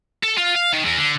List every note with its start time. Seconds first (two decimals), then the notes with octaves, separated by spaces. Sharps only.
0.23 A4
0.38 F4
0.55 F5
0.73 D#3
0.85 E2
0.98 D3